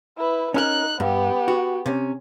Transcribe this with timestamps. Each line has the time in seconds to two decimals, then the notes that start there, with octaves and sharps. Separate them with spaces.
0.17 E4 B4
0.54 C#4 D#4 A#4 F#6
1.00 G2 B3 G4
1.48 F#4
1.86 C3 C#4